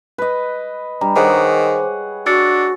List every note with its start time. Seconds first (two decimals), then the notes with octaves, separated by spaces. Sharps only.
0.18 B4 D#5
1.01 G3 D4 A#5
1.16 D#3 G#4 C5 C#5 F#5 D6
2.26 D4 F#4 E6 A6 C#7